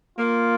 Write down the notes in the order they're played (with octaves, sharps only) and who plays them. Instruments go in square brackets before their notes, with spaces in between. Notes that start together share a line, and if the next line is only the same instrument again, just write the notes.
[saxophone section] A#3 [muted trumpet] F4